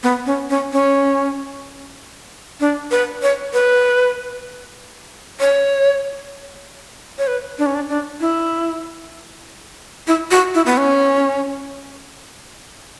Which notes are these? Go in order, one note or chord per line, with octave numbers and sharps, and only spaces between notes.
B3
C#4
C#4
C#4
D4
B4
C#5
B4
C#5
C#5
B4
D4
C#4
D4
D4
E4
E4
F#4
E4
B3
C#4